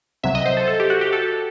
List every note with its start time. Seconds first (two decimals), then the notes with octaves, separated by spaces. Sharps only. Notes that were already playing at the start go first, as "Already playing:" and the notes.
0.23 C2 C3 F#3 E5
0.35 D#5
0.46 C5
0.57 A4
0.68 A4
0.80 G4
0.90 F#4
1.01 G4
1.13 A4